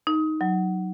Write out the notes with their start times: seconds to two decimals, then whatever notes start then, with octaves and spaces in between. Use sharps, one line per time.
0.07 D#4
0.41 F#3